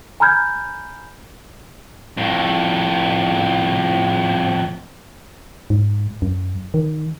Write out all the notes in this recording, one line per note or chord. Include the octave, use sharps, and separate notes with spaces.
G#5 A#5 B5 F6 G6 G#6
F2 A2
G#2
F#2
D#3